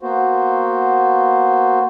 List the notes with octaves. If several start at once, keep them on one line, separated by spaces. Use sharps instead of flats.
A#3 B3 F#4 C5